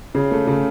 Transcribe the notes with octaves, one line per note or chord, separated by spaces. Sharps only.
C#3
A3
C#3